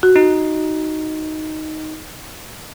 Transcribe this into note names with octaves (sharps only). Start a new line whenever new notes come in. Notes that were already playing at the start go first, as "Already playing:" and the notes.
F#4
D#4